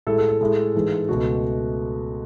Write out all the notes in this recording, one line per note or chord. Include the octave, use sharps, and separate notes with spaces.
A2 G#3 A4
A4
A4
A2 G#3
G#2 E3 G#3
C#2 B2 A3 F#4